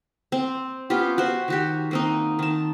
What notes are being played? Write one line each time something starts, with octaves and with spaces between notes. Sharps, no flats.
C4
B3 C#4 F4 G4
F#4 C5
D#3 F#4 G4
A#3 C4 D#4
D#3 A5